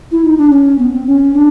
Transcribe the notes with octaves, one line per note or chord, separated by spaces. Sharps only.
E4
D#4
D4
C#4
B3
C4
C#4
D4